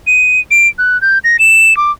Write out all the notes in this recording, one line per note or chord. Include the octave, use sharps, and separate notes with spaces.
D#7
D7
F#6
G6
A#6
E7
D6